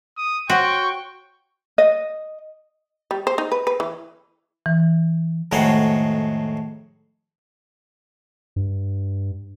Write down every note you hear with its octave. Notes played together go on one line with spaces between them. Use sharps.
D#6
F#4 C5 C#5 F#5 G5 C#6
D#5
G3
C5
D#4
B4
B4
E3
E3
F2 A2 D#3 G#3 F#4 C#5
G2